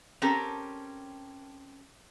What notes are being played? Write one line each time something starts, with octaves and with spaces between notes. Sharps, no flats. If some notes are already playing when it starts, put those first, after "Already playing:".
C4 C#4 G4 A4 A#4